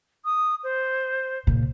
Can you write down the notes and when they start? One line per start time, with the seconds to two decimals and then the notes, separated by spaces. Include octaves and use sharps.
0.25 D#6
0.64 C5
1.47 A#2 C#3